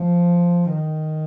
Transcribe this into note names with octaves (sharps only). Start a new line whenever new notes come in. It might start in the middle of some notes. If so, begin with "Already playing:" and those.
Already playing: F3
D#3